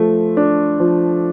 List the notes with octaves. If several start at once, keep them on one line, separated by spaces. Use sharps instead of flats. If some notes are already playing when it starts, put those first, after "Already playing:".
Already playing: F3 A3
D4
F3